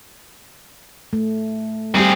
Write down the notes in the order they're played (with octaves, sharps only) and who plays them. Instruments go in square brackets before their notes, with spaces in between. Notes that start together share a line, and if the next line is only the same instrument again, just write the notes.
[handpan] A3
[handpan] G3 G4 [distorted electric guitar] C4 G#4